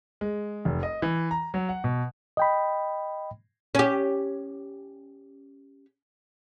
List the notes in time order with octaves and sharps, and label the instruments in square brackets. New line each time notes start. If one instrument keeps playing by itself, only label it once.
[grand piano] G#3
F1
D#5
E3
A#5
F#3
F#5
B2
[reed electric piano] D#5 G5 B5
[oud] C#4 G4